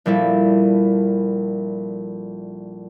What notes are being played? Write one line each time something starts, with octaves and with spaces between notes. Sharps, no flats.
A#1 G3 E4 A4